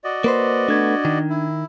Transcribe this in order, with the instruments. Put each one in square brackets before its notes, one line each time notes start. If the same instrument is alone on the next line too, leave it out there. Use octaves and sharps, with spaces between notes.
[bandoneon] F#4 D5 D#5
[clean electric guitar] A#3 B4 C5
[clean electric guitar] A3 B3 [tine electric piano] D4 G#6
[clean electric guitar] D#3
[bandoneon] E4